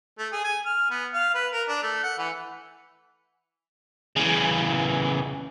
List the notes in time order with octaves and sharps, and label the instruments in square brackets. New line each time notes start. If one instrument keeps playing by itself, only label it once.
[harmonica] A3
G#4
G#5
F6
B3
F5
B4
A#4
D4
A3
F#5
E3
[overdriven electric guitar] C#3 E3